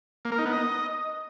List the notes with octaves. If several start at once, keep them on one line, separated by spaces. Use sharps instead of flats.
A#3
A#4
D#4
B3
D#5